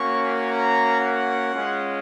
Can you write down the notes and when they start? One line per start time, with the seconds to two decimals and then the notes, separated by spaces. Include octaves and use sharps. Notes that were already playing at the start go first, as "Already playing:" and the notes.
Already playing: A#3 C#4 F#4 C#6
0.49 A#5
1.01 F#5
1.54 G#3 C#4 F4